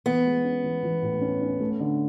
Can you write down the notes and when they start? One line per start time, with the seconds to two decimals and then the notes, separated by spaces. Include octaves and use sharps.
0.06 E3 B3
0.25 G#3
0.44 C#4
0.64 E3
0.83 E3
1.02 A2
1.21 C#4
1.42 C#4
1.61 A3
1.80 D3